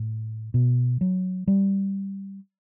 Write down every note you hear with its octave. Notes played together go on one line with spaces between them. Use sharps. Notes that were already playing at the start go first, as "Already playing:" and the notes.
Already playing: A2
B2
F#3
G3